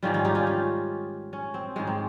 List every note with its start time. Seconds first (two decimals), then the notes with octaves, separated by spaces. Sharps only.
0.03 G#2 D#3 G3 C#4 F4
0.14 C#4 F4
0.25 D#4 G4
0.35 C#4 F4
0.47 C#4
1.33 C#4
1.54 C4
1.76 G#2 D#3 G#3 C#4
1.87 C4